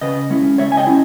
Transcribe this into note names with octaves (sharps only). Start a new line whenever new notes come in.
C#3 B4 D#5
G#3 C#4 E4
C#3 C#5 E5
G#5
D#5 G5
C#4 E4